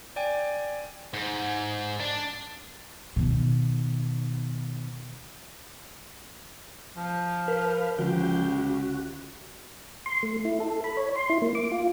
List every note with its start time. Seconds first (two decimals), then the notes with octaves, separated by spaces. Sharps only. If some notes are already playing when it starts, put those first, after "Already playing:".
0.16 D5 G5 G#5
1.13 G#2
2.00 D4
3.16 B2 D#3
6.96 F3
7.48 A#4 B4 F5
7.98 C#2 D3 F3 F#4 G5
8.58 F#4
10.06 C6
10.23 A3
10.45 E4
10.60 A4
10.84 B5
10.97 C#5
11.16 C6
11.29 E4
11.42 A#3
11.55 D6
11.72 F4